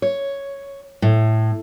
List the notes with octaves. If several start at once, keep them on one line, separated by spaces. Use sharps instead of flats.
C#5
A2